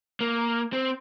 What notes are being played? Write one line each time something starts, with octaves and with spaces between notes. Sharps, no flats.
A#3
C4